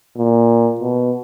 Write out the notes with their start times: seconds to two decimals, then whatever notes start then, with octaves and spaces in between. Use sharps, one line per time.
0.17 A#2
0.81 B2